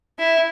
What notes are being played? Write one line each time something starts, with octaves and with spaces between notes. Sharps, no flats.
E4